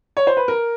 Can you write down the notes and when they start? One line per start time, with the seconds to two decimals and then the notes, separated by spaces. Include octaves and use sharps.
0.17 C#5
0.27 C5
0.37 B4
0.48 A#4